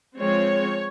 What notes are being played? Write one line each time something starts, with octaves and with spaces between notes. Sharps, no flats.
F3 G#3 C4 C#5